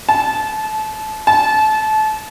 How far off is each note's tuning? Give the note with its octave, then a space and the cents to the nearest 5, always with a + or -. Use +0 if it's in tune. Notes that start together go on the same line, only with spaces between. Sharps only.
A5 -25
A5 -30